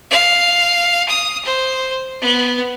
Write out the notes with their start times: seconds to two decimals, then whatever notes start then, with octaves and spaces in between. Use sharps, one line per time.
0.11 F5
1.09 D#6
1.45 C5
2.22 B3